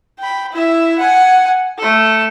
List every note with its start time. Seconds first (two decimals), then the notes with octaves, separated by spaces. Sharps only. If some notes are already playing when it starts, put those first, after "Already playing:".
0.19 G5 B5
0.52 E4 E5
0.98 F#5 G#5
1.78 A3 A4